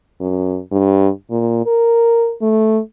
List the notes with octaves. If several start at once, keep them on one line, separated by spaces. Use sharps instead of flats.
F#2
G2
A#2
A#4
A3